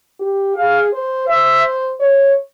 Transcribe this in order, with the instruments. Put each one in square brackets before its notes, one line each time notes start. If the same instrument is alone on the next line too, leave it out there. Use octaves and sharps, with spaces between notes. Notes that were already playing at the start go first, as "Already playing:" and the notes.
[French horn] G4
[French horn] G#4 [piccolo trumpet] F5
[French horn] C5
[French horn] C5 [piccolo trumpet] E5
[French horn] C#5